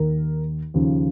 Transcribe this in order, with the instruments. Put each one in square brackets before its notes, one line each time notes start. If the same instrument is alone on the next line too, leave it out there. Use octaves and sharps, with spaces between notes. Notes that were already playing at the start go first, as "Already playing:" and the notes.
Already playing: [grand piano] D#2 D#3 A#4
D#2 C#3 F3